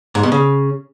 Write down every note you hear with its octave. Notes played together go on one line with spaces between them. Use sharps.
G#2
B2
C#3